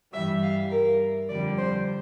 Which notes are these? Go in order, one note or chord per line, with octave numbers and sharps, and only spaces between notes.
G2 E3 G3 E5
F5
A#4
F2 D3 G3 D5
C5